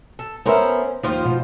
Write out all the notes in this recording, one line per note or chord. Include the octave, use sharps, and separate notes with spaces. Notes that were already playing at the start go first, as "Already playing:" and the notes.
A4
B3 C#4 A#4 C5 E5
D#2 F3 F4 C5
B2